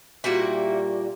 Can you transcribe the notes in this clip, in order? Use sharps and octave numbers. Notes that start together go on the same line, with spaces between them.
A#2 G3 A#3 E4 F#4